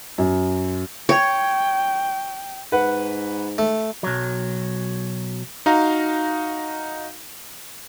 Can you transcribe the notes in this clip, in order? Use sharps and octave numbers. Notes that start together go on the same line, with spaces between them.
F#2
C#5 G5
G#2 B4 F#5
A3
B1 F#3
D#4 F#4 F5 A#5